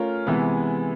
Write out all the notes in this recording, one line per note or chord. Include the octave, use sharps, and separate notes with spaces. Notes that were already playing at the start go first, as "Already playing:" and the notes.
Already playing: A3 C#4 F4 A#4
C3 E3 G#3 B3